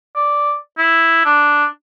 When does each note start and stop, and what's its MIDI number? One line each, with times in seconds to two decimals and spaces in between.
0.15 0.54 74
0.78 1.24 64
1.25 1.65 62